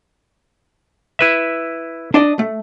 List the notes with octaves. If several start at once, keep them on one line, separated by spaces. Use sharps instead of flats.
E4 B4 E5
D4 D5 D#5
A3